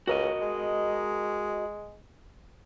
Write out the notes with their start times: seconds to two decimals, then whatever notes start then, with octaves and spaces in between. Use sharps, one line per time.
0.07 C#2 F#4 A#4 D#5
0.41 G#3